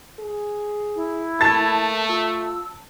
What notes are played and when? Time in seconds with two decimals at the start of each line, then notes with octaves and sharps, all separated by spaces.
0.19 G#4
0.95 E4
1.41 A3 A#3 A5 A6
2.09 F4 E6